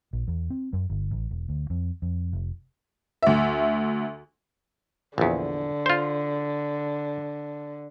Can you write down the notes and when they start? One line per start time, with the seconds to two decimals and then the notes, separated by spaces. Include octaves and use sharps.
0.13 A#1
0.28 E2
0.50 C4
0.73 F#2
0.90 G1
1.11 A1
1.31 E1
1.49 D2
1.70 F2
2.02 F2
2.33 F1
3.23 D2 E5
5.18 A#1 E2 D3
5.86 F4 C5